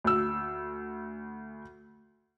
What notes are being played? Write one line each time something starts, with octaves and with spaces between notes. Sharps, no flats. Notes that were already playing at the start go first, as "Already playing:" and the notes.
D2 E6